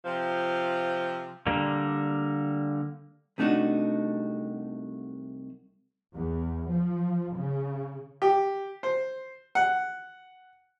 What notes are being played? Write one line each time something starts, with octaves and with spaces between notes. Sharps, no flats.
C3 F3
D3 G3 A#3
C2 C3 A3 D4 D#4 F#4
E2
F3
C#3
G4
C5
F#5